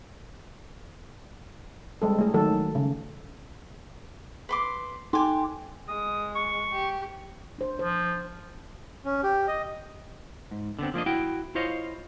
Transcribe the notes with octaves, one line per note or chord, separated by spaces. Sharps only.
G3 G#3 A4
A3 G#4
D#3 F#3 A4
C#3
B4 C6 D6
D#4 G4 G#5 C6
G#3 D#6
C#6
G4
D4 C5
F3 C5
C#4
G4
D#5
G#2
D3 B3 C4
F3 A#3 D4 D#5
E4 F#4 G5
E4 F4 C5 C#5 D#5 F5